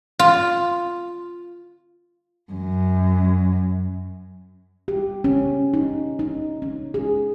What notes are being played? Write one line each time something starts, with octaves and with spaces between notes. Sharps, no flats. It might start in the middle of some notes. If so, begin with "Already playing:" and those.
F4
F#2
G4
C#4
D#4
D#4
C#4
G#4